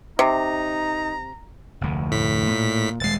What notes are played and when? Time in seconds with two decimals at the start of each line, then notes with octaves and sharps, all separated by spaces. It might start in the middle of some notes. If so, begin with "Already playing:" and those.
0.19 C3 D#4 A#5
1.81 F1 D2
2.12 A2 B6
2.51 A#2
3.00 D#1 G#3 A6 C7